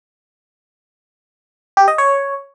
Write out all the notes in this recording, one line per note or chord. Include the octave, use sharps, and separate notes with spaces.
G4
D#5
C#5